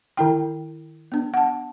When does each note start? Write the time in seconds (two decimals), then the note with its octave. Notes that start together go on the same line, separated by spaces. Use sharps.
0.17 D#3 E4 G5
1.12 B3 D4
1.34 F#5 A5